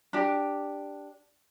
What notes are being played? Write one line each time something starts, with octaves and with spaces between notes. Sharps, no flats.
D4 G4